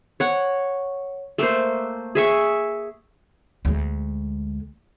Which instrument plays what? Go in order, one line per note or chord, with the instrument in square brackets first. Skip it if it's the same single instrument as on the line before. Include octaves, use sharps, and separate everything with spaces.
[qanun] C#5 F#5
A3 A#3 C5
G#4 E5 C#6
[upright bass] D2 G#3